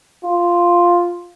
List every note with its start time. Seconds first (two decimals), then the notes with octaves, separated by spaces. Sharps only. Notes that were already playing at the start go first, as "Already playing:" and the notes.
0.24 F4